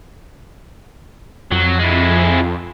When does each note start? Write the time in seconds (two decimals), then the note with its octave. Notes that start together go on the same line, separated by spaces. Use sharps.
1.52 F2 F#3
1.79 G#3 E4